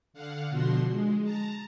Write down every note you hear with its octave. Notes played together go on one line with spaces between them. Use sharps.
D3 F5 F#5
B2 D3 F3 F#4 C6
G#3
A5 A#5